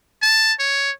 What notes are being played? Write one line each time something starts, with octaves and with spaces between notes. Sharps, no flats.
A5
C#5